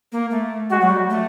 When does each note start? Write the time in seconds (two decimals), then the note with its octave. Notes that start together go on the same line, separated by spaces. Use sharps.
0.12 A#3
0.31 A3
0.70 G#3 F#4
0.81 F#3
0.90 G3
1.10 A3